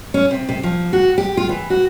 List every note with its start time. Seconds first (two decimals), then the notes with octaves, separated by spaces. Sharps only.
0.14 C#4
0.31 C3
0.49 C3
0.63 F3
0.93 F#4
1.18 G4
1.37 F4
1.49 E3
1.70 F#4